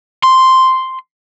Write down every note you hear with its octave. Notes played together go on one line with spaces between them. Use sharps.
C6